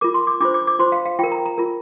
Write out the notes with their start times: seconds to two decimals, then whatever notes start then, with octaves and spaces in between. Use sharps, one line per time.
0.01 F4 A#4 D6
0.14 C6
0.27 D6
0.40 D4 F4 C5 D6
0.54 D6
0.67 D6
0.79 F4 C5 C6
0.92 F5
1.05 F5
1.19 F4 A#4 G5
1.32 A#5
1.46 A#5
1.58 F4 A#4